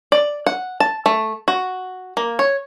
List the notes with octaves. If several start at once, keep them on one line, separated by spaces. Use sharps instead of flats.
D5
F#5
A5
A3
F#4
A#3
C#5